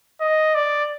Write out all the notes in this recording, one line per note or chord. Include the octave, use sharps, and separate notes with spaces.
D#5
D5